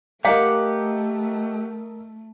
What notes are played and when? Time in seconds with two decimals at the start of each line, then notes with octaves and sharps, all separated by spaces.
0.25 A3 G4 A#4 D#5 F5 F#5 A#5 D6